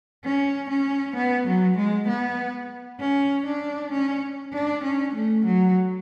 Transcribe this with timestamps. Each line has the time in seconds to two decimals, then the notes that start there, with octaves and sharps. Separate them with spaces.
0.24 C#4
0.70 C#4
1.16 B3
1.47 F#3
1.77 G#3
2.08 B3
3.00 C#4
3.46 D4
3.92 C#4
4.53 D4
4.84 C#4
5.15 A3
5.46 F#3